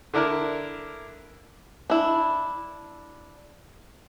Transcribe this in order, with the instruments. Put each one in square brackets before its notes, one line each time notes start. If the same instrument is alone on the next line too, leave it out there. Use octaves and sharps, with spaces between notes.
[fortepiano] D3 D4 E4 A#4
[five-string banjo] D4 E4